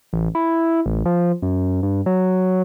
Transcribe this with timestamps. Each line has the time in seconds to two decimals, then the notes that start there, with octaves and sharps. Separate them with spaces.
0.13 A1
0.35 E4
0.86 A1
1.06 F3
1.42 F#2
1.83 G2
2.06 F#3